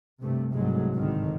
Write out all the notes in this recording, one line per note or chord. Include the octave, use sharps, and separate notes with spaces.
G2 C3 A3
C2 G#2 F#3 G#3 A3
G#1 G2 D3 D#3